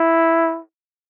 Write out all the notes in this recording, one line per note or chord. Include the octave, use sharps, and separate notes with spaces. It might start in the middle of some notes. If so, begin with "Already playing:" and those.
Already playing: E4